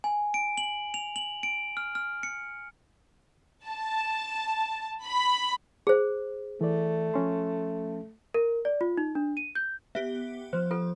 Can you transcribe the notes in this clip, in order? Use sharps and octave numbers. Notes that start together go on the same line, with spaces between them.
G#5
D7
F#7
F7
F#7
D7
F6
F6
C#7
A5
B5
G#4 C5
E3 A3 D5
F3 C#4 C6
A#4
D5
F4
D#4
D4
D#7
G6
B3 G4 E5
F3 C5
F4 A4